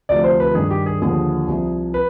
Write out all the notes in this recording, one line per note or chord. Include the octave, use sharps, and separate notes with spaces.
D2 C3 F3 D5
C5
B4
G2 D#3 G#4
G4
G#4
D#2 D3 F3 G#4
C2 C3 F3
B4